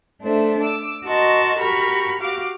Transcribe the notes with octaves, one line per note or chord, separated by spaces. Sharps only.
A3 D4 A4 C5 E5
D6 E6
F#4 A#4 D#5 A5 C6 C#6
F#4 G4 A#4 B5 C#6 F6
F#4 G4 F5 D6